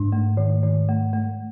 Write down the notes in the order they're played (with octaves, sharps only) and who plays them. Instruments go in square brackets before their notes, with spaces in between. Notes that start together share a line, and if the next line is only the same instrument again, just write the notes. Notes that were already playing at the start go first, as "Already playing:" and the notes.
Already playing: [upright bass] G#2 [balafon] D4
[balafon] A3
D#3
D#3
A3
A3